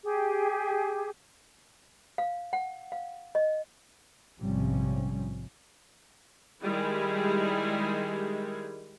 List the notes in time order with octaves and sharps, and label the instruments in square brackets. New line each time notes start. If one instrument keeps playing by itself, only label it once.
[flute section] G4 G#4
[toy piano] F5
F#5
F5
D#5
[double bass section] A#1 G#2 C3 F3 G3 C#4
[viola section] D#3 G3 G#3 E4 G4 G#4